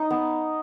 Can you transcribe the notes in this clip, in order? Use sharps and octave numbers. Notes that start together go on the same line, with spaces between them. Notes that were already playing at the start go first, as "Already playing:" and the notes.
Already playing: D#4
B3